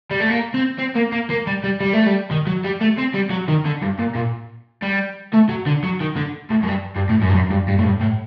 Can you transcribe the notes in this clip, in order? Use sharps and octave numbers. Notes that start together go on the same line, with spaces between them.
G3
A3
A#3
C4
C4
A#3
A#3
A#3
G3
G3
G3
A3
G3
D#3
F#3
G3
A3
C4
G3
F#3
D#3
D3
G2
A#2
A#2
G3
A3
F#3
D3
F#3
D#3
D3
A2
F#2
G2
G2
A2
F#2
G2
F#2
G2
G2
A2
G2
A2